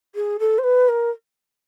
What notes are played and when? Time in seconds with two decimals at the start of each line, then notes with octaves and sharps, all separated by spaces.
0.15 G#4
0.39 A4
0.58 C5
0.64 B4
0.88 A#4